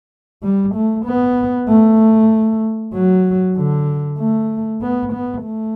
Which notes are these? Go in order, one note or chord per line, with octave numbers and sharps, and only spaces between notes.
G3
A3
B3
A3
F#3
D3
A3
B3
B3
A3